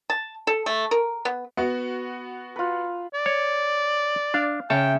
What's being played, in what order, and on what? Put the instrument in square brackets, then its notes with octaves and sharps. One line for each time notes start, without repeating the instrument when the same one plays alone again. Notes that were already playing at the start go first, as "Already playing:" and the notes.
[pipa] A5
A4
A3
A#4
B3
[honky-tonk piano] B3 F#4
[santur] F4 B4
[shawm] D5
[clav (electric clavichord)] C#5
[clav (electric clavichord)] D4 [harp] F5
[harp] C#3 C#5 E5 [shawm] G5 [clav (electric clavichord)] A5